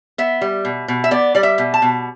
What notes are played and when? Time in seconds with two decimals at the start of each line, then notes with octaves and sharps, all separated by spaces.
0.18 B3 E5
0.41 G3
0.65 B2
0.88 B2
1.04 E5
1.11 B3 D5
1.35 G3 D5
1.43 E5
1.58 B2
1.74 A5
1.82 B2